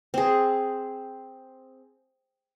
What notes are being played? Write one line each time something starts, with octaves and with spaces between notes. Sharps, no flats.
C4 G#4